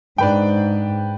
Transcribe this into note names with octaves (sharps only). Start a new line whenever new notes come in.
G#2 D4 B4 G5